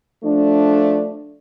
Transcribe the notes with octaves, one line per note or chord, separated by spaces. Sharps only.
F3 A3 D4